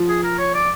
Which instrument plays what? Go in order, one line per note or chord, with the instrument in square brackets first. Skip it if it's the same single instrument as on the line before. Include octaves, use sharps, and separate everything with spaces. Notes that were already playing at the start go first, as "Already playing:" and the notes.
Already playing: [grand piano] F3
[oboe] G#4
A#4
C#5
D5